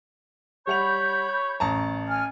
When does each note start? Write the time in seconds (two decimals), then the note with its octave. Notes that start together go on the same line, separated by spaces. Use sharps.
0.67 G3 C#5 F#5 B5 G6 F7
1.60 A1 A5 A#5
2.08 G#5 F6